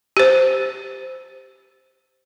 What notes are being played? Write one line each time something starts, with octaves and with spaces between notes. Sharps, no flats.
G4 C5